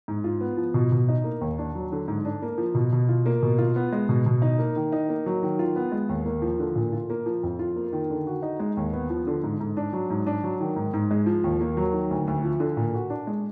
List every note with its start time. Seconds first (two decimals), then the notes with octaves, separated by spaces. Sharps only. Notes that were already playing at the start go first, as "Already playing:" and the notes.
0.08 G#2
0.24 F4
0.41 B3
0.57 F3
0.74 B2
0.92 B2
1.08 D#4
1.24 A#3
1.41 D#2
1.58 D4
1.75 F#3
1.92 D3
2.08 G#2
2.25 D4
2.42 A#3
2.58 F3
2.75 B2
2.92 B2
3.09 F4
3.26 A#3
3.42 B2
3.58 F4
3.76 B3
3.93 G#3
4.09 B2
4.26 B2
4.42 D#4
4.59 A#3
4.76 D#3
4.92 D#4
5.09 A#3
5.26 F#3
5.43 D#3
5.59 F4
5.76 B3
5.92 G#3
6.09 D#2
6.26 A#3
6.42 F3
6.59 D3
6.76 A#2
6.93 F4
7.10 A#3
7.26 F3
7.43 F2
7.59 F4
7.76 A#3
7.93 D#3
8.10 D3
8.27 F#4
8.42 D#4
8.60 G#3
8.77 D#2
8.93 B3
9.10 F3
9.27 D3
9.44 G#2
9.60 G#2
9.77 D4
9.93 F#3
10.10 G#2
10.27 D4
10.44 F#3
10.61 D#3
10.76 G#2
10.94 G#2
11.11 G#3
11.26 F3
11.44 D#2
11.61 A#3
11.77 F#3
11.93 D#3
12.11 D2
12.28 D2
12.44 F3
12.60 D3
12.77 A#2
12.94 F#4
13.10 D4
13.27 G#3